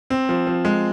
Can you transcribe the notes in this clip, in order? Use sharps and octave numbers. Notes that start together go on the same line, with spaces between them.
C4
F3
F3
G#3